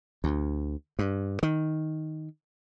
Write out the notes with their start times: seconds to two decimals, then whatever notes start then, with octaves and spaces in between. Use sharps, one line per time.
0.24 D2
0.99 G2
1.43 D#3